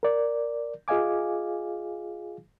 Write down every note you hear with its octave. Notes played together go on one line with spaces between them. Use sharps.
A#4 D5
F4 G#4 D#5 F5 G#5 D6